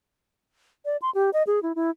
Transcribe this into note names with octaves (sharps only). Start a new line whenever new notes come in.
D5
C6
G4
D#5
G#4
E4
E4